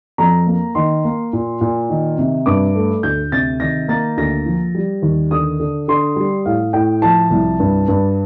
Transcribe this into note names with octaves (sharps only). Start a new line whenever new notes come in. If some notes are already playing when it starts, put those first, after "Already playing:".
F2 A#5
A#3
D#3 C6
A#3
A#2
A#2
D#3
C3
G2 D6
A3
D2 G6
C3 A6
D#3 A#6
A#3 A6
D2 A#6
F3
G3
D#2
D3 D#6
D3
D3 C6
G3
A2 F5
A2 G5
F3 A5
C2
G2
G2